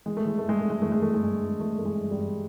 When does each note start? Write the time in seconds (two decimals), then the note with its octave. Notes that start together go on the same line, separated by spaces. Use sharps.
0.06 E3 G#3
0.17 A3
0.25 E3 G#3
0.38 A3
0.44 G2
0.49 G#3
0.60 G2 A3
0.70 G#3
0.82 E3 A3
0.92 G#3
1.02 E3 A3
1.14 G#3
1.22 G2
1.41 G2
1.60 E3 A3
1.78 E3 A3
1.85 G#3
1.98 G2
2.11 G3
2.18 G2